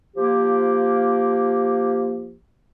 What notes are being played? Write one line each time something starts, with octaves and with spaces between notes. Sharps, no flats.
F3 A#3 G4